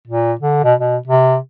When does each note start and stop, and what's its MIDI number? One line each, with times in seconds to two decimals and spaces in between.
0.08 0.33 46
0.41 0.62 50
0.64 0.74 47
0.80 0.97 47
1.08 1.37 48